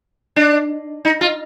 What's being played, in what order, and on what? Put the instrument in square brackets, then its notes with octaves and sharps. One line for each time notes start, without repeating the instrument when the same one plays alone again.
[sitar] D4
D#4
F4